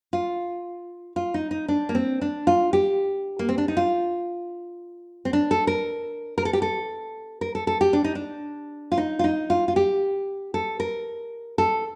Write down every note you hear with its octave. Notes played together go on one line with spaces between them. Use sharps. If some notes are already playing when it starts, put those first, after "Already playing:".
F4
F4
D#4
D#4
D4
A#3
C4
D4
F4
G4
A#3
C4
D4
D#4
F4
C4
D4
A4
A#4
A#4
A4
G4
A4
A#4
A4
A4
G4
D4
D#4
D4
F4
D#4
F4
D#4
F4
F4
G4
A4
A#4
A4